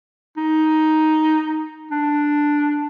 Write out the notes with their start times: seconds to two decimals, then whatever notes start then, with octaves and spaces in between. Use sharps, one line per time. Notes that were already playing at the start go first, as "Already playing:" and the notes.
0.37 D#4
1.91 D4